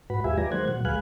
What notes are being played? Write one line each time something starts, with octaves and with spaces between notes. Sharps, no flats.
G#2 F#4 B4 B5
D#2 G#3 F4 G4 E5 G#5
F#3 B4 D5 G#5 A#5
D#3 G#3 A#3 C5 F#5 G#6
A#2 F#3 F#5
D2 G#3 B4 F5 G#5 F#6